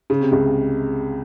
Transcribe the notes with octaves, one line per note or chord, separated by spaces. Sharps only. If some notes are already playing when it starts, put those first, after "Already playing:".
C#3
C3
C#2 C#3